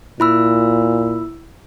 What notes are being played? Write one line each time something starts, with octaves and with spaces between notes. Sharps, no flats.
A#2 E4 B5 E6